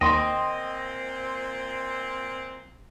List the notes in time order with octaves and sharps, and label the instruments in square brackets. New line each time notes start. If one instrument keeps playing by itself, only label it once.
[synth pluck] D#2 [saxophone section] A#2 C4 [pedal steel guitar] D#5 [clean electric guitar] G5 C6